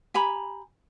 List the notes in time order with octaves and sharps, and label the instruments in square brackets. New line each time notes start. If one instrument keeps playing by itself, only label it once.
[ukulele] G4 G#5 A#5 B5